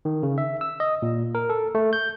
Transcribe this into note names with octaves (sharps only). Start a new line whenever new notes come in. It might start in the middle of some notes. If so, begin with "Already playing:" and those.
D#3
C#3
E5
E6
D#5
A#2
A#4
A4
A3
G6